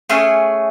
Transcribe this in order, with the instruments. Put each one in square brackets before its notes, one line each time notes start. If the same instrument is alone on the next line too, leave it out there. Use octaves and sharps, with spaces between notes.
[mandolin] A3 C#4 G#4